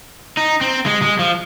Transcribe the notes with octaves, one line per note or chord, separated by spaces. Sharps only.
D#4
C4
G#3
G#3
F3